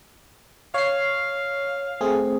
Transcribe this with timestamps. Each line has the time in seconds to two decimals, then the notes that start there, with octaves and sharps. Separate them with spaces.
0.74 C#5 F5 C7
2.01 A3 C4 G#4